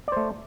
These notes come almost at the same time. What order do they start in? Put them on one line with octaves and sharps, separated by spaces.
D5 C5 A3